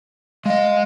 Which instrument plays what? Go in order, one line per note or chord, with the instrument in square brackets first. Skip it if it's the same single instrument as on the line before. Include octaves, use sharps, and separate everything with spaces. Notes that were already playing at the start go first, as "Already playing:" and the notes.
[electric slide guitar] G#3 D#5 [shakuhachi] F5